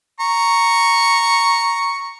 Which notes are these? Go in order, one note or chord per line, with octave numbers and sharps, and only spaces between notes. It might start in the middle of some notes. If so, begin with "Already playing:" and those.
A#5 C#6